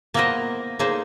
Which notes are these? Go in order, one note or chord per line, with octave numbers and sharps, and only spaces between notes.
A#3 B3 E4 A#4 C5 D#5
A2 A#3 D#4 G#4 C5